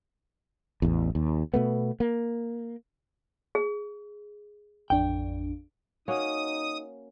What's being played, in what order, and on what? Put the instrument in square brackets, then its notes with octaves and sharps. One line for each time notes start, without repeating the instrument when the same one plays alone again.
[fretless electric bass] A1 E2
D#2
B2 A3 B3
A#3
[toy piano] G#4
[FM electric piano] A1 F2 D4 [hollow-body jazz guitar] G5
[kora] A#3 C#4 F#4 [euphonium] D#4 [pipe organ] D#6